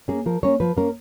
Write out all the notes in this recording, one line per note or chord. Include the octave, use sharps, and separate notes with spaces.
A#3 C#4 G#4
F3 A#4
A#3 C#4 C#5
F3 B4
A#3 C#4 A#4